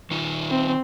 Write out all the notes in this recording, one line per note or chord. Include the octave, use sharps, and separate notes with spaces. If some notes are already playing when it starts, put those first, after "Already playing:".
D#3 D#4 F4
C4